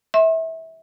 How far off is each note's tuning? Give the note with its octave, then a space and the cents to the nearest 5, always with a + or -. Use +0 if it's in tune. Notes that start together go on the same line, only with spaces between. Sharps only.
E5 -25 C6 +40